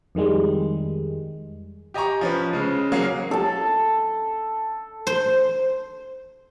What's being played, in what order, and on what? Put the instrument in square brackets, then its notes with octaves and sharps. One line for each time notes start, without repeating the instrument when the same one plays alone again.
[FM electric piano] F2 D#3 G3 G#3
[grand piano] G4 D#5 G#5 A#5 C#6
F3 C#4 B4
C#3 G#3
F#3 A#3 C#4 G#4
[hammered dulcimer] A4 A5
[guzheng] C5